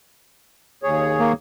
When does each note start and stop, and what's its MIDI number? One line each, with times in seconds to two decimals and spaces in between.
0.83 1.32 39
0.83 1.32 68
0.83 1.32 73
1.19 1.33 58